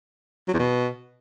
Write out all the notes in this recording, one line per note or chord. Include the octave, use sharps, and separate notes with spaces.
F#3
E2
B2